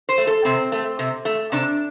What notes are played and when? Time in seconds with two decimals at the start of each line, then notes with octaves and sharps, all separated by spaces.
0.09 C5
0.18 A3
0.27 A4
0.45 C3 C4
0.72 A3
0.99 C3
1.25 A3
1.52 C3 D4